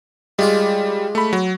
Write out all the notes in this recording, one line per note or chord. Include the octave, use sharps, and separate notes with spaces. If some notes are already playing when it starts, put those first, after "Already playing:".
G3 G#3 F4 D6
A3 B5
F#3